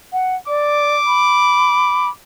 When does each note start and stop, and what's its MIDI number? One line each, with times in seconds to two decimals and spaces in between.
0.13 0.36 78
0.48 0.95 74
0.48 2.10 86
1.07 2.10 83